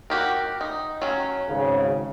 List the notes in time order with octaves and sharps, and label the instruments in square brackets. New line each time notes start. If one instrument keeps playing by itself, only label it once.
[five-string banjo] F#4 G4 A#4
D#4
F#3 C#4
[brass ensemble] G#1 C#3